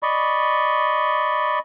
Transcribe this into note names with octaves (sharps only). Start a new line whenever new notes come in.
D5 D#5 B5 C#6